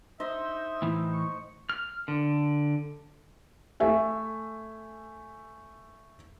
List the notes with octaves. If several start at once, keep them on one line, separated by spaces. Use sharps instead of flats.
D#4 C5 D#5 E5
A2 E3
C#6
F6
D3
A3 E5 G#5